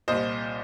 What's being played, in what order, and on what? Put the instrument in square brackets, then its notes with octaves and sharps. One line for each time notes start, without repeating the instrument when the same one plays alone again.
[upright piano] C2 A#2 C5 D#5